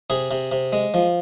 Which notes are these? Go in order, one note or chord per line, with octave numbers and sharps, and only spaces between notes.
C3 G#4
C3
C3
G#3
F3